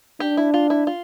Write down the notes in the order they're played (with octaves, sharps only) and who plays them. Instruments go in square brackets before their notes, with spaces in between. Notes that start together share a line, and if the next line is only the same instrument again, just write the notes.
[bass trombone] D4 [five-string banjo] G4
[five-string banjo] E4
F4
E4
F4